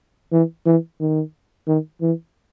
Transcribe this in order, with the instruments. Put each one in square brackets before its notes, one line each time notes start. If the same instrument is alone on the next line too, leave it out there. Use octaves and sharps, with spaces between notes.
[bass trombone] E3
E3
D#3
D#3
E3